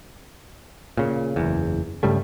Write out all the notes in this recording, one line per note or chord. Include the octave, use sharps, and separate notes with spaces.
A#2 C#3
F#1 E2
G2 C#3 G3 A3